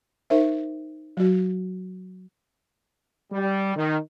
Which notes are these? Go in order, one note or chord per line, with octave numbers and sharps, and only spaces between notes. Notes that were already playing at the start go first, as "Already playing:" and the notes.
D#4 A#4 C5 E5
F#3 F#4
G3
D#3